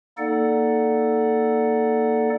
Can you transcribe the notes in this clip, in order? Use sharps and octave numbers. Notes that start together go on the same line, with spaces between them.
A#3 D#4 A4 D5 F#5